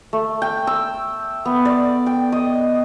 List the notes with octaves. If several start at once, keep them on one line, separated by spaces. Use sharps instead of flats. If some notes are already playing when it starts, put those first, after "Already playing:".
A3
G5
E6
B3
D5
G5
D#5